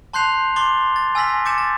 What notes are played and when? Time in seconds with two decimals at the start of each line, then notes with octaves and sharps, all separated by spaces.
0.13 A5 C6 F#6 G6 C7 F7
0.56 C6 D6 A6 G7
0.96 A6
1.15 G#5 E6 F6 A#6 B6 F#7
1.45 D6 G6 A6 C#7 E7
1.58 A6